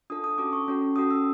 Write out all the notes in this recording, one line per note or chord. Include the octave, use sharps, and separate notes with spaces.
D4 F4 A4 D#6
D#6
C#4 F#4 A4 D6
C#6
C#4 F#4 A4
C#4 F#4 A4 D#6
E6